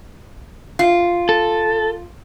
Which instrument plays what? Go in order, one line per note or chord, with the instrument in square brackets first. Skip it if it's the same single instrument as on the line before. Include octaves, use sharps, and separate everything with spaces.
[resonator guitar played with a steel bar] F4
[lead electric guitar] A4